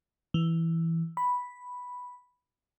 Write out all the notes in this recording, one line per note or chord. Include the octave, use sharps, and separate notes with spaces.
E3
B5